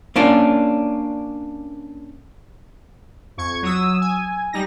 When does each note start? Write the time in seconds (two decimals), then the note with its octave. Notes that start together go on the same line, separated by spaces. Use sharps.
0.16 A#3 C#4 D4 F4 D5
3.37 F2 C#6 G#6
3.62 F#3 D#6 E6
4.01 G#5
4.53 G3 D#4 A#6